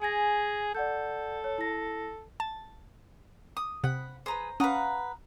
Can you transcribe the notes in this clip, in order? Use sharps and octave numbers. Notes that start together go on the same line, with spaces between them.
G#4 G#5 G#6 A#6
A4 D5 F#5 G6
C#5
E4 A#6
A5
D#6
C3 F#5 B5
G#4 B4 C5 A#5
C#4 B4 F5 F#5 A#5 D#6